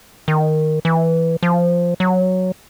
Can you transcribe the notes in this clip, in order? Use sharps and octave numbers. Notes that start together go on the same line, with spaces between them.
D#3
E3
F3
F#3